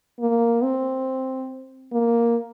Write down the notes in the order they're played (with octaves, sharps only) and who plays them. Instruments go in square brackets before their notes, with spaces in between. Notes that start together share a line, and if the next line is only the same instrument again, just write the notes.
[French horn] A#3
C4
A#3